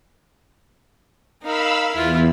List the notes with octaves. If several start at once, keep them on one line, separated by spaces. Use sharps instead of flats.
D#4 A#4 F5 B5 E6
E2 E4 F4